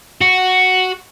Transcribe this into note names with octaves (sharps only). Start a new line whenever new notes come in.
F#4